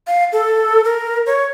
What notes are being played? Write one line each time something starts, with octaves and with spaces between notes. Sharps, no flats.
F5
A4
A#4
C#5